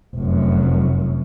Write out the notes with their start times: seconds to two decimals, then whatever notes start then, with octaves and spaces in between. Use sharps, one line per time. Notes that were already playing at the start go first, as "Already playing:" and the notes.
0.16 F1 F#2